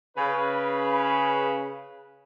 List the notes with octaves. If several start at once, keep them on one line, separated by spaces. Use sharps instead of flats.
C#3 B4